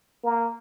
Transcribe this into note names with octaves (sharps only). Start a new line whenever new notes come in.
A#3